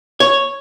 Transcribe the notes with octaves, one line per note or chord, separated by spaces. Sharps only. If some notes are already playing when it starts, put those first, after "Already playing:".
C#5